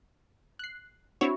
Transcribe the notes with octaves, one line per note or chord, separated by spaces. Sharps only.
F#6 C7
C4 D4 E4 F#4 C#5